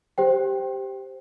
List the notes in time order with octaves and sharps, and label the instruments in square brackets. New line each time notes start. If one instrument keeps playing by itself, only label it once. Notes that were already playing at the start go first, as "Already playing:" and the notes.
[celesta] G4 C5 G5